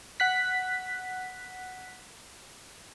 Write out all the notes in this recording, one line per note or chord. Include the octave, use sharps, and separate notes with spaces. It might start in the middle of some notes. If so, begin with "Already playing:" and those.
F#5 F#6 B6